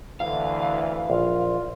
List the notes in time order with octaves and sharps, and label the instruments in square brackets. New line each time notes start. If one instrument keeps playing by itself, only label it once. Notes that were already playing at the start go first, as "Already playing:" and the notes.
[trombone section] D2 E3 [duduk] D3 [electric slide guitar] F5
[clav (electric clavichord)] A#1 [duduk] F4